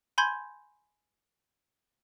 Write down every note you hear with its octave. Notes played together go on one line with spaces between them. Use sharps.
G#5 B5 C6 G6 G#6